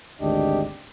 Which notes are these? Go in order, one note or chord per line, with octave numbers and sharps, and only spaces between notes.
G#1 D2 D4 G4 D#5